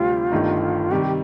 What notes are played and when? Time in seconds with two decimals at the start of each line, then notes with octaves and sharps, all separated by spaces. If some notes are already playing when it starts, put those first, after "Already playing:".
Already playing: D2 C3 G3 C4 F4 G4
0.32 G1 G2 D#3 A3 D#4
0.91 C3 D#3 G3 G4